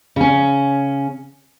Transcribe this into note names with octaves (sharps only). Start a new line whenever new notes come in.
C#3 C#4